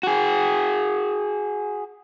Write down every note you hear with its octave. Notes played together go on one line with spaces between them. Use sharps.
F#4 G#4